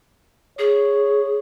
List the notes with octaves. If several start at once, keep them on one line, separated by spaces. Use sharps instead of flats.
G#4 C#5